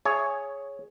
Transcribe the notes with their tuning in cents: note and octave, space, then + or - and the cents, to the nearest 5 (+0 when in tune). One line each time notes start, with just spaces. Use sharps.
G#4 +0 C#5 +0 E5 +15